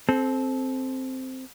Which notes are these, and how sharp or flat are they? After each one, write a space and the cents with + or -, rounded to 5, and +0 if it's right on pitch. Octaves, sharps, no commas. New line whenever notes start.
C4 +0 A4 -25